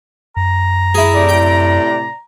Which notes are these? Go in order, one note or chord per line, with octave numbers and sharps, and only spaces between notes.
F#2 A#5
E4 G#4
A2 C3 D5
G5